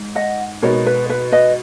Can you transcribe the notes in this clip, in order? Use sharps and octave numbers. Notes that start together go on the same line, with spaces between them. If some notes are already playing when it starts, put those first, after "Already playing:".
Already playing: G#2
D#5 F#5
B2 G#3 B3 D#4 A#4 C#5
B4
B4
B4 D#5